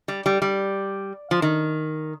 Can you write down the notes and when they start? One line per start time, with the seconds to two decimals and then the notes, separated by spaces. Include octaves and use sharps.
0.08 G3
0.26 G3
0.42 G3
1.31 F3
1.42 D#3